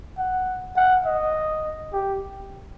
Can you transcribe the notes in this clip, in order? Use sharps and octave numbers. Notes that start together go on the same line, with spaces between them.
F#5
F#5
D#5
G4